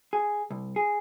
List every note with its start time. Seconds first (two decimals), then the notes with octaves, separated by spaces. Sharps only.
0.13 G#4
0.51 C2
0.76 G#4